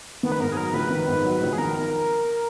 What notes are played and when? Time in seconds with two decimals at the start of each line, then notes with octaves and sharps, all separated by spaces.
0.23 D#3 B3
0.32 B4
0.40 G#2 A#4
0.52 G#4
0.57 F#3 A#4
0.74 A#1 B4
0.90 D#3
1.08 G#2
1.24 F#3
1.42 A#1
1.53 G#4
1.58 D#3 A#4